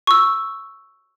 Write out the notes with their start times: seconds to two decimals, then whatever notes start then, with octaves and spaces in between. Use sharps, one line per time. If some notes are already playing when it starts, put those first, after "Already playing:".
0.07 C#6 E6